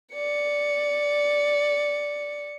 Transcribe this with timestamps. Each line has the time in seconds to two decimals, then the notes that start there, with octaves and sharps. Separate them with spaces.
0.14 D5 C#7